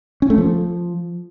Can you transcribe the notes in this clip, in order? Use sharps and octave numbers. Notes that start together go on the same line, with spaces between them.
C#4
A3
F3